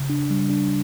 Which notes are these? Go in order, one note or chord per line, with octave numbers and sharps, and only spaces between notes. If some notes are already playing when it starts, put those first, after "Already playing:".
Already playing: C#3
D4
G3
D4